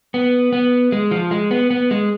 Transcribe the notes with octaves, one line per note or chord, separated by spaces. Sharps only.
B3
B3
G#3
F3
G#3
B3
B3
G#3